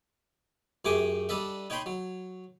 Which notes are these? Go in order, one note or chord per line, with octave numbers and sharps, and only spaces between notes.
F#2 A3 G4 G#4 D6 D#6
G3 D4 A4 D#5 E5
D#4 C#5 G5 B5 C6
F#3